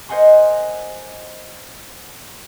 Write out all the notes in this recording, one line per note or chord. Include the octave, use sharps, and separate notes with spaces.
A#4 C5 D#5 F#5 G#5 C6